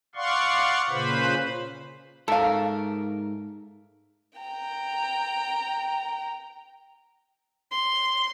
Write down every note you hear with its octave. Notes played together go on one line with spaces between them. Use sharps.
D5 F5 F#5 C6 C#6
A#2 C#3 B4 C5 B5
G#2 A4 A#4 E5 F5
G5 A#5
C6